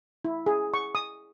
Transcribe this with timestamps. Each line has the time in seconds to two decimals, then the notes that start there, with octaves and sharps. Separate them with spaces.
0.25 E4
0.46 G#4
0.74 C#6
0.95 D#6